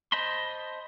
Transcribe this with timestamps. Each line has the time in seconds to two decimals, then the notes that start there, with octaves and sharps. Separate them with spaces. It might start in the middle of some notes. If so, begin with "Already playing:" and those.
0.12 C5 D#5 A5 B5 C6